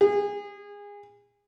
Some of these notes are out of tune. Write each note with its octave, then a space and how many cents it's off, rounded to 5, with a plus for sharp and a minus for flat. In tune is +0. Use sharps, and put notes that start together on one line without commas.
G#4 -25